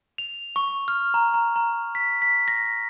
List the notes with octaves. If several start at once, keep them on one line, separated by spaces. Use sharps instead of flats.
F7
C#6
F6
A#5
A#5
A#5
B6
B6
A#6